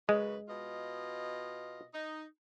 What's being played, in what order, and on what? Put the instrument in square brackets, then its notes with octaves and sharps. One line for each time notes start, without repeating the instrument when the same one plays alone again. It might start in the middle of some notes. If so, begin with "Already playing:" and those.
[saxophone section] F#2 C#3 B4 [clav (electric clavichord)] G#3
[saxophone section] B2 F4 D#5
D#4